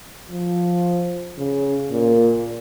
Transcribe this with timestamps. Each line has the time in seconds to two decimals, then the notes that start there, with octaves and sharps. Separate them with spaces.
0.31 F3
1.38 C#3
1.91 A#2